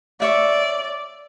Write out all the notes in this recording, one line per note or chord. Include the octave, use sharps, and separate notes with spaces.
C#5 D5 E5 F5